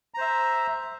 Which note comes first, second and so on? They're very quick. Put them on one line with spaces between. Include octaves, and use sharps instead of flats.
A#5 C5 E5